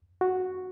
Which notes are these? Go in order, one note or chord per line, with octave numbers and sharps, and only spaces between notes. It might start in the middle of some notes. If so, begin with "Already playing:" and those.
F#4